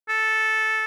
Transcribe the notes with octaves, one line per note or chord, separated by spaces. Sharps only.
A4